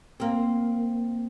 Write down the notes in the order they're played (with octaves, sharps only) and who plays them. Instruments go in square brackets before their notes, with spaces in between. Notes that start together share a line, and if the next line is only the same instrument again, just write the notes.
[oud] A#3 C4